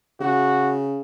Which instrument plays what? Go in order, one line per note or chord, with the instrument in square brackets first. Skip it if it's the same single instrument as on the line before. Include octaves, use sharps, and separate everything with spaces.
[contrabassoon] C#3 [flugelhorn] F#4